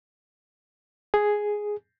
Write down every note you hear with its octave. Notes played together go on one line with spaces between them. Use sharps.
G#4